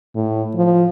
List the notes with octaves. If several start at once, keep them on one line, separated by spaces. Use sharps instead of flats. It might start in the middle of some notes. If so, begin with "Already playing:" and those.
A2
F3